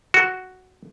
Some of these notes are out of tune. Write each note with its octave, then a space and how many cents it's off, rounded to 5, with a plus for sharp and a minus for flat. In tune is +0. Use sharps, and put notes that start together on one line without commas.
F#4 +5